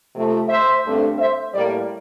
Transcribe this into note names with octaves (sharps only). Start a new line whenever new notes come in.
C3 F3 A3
C5 E5
G2 D3 A3 C4
C5 E5
A2 G3 A#3 A#4 D5